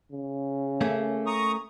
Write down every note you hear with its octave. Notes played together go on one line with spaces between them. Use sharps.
C#3
A3 A#3 C#4
A#5 C#6 D#6